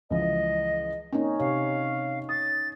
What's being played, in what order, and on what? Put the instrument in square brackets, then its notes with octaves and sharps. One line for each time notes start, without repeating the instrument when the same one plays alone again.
[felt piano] C#2 E3 F3 [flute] D#5
[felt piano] A#3 C4 [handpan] C#4 D#4
[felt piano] C3 G4 [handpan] C#5 [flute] F5
[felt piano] D#6 [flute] A6